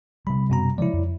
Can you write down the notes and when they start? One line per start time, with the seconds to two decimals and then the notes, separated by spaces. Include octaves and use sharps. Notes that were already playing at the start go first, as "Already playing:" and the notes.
0.27 C3 G3 B5
0.50 F#2 B2 A#5
0.78 C#3 F3 G#3 E4 C#5 D5
0.93 F2